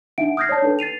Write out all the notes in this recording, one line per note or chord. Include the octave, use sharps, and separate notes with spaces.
D4 D#4 E5 F#5 D7
D#6 F6 G6 G#6 A#6 C7
C#5 D5 A5 G6
D4 D#4 A4 B4
A6 C7 D#7 F7